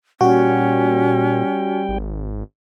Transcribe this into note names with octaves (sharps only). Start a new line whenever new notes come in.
A#2 G3 C#4 F#4 G5
G#1